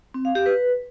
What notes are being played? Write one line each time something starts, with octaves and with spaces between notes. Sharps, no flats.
C4
F5
G4
B4